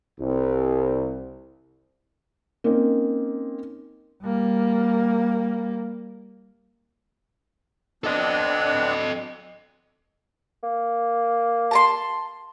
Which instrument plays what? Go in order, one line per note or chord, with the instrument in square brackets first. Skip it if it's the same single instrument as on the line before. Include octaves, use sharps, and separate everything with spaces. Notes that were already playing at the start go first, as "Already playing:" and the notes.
[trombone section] C2
[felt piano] A#3 C4 C#4 D#4
[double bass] G3 A#3
[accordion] B3 C4 D4 [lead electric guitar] A4 D#5
[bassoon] A#3
[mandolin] A5 A#5 C6